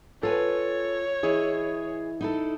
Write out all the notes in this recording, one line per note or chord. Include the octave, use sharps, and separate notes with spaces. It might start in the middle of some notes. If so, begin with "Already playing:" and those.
F4 A4 B4 C#5 G#5
E3 E4 G#4 D#5
D#4 E4 A4